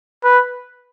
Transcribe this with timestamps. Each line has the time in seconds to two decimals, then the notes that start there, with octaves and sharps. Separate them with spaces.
0.24 B4